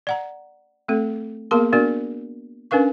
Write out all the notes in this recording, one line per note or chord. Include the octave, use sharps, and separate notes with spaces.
D5 F#5 A#5
A3 C4 A4
A#3 B3 G#4 A#4 A5 C6
B3 D4 F#4 A#4 D5
C#4 D4 A#4 B4 F5 C#6